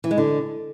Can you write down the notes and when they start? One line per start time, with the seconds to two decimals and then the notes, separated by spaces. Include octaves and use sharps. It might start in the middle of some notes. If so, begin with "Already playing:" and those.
0.04 E3
0.11 G#3
0.18 D3